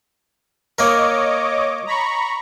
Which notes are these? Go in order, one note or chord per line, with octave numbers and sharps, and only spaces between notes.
A#3 A#4 C#5 D#5 D6
A#5 B5 C#6